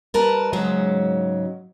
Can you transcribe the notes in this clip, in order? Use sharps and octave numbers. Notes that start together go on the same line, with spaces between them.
G3 A#4 B4 A5
G#2 C#3 F#3 G#3